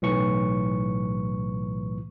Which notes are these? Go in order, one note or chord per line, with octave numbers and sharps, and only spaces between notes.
B1 A2 E3 C#6